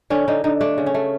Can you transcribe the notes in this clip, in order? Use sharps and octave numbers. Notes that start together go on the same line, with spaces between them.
D3 C#4
D3 D#4
D3 D#4
A3 D4
C#3
C#4
A3